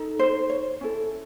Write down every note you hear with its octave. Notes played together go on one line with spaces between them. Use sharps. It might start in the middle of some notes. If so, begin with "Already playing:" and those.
Already playing: D#4 A4
C5
C#5
C#4 E4 A4